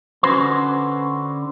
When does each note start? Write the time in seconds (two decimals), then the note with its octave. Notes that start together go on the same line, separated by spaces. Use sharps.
0.23 D3 C#4 F#4 B4 C5 C6